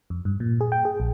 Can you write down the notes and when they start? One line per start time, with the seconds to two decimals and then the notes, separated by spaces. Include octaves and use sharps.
0.10 F2
0.25 G2
0.40 A#2
0.61 G#4
0.72 G5
0.85 G#4
1.00 A#1